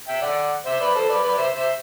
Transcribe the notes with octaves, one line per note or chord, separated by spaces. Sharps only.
E5 G5
D5 F#5
C5 E5
B4 D5
A4 C5
B4 D5
B4 D5
C5 E5
C5 E5